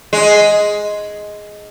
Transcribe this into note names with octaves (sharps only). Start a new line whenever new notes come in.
G#3